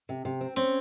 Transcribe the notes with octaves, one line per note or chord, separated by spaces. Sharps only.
C3
C3
C4
C4 C#4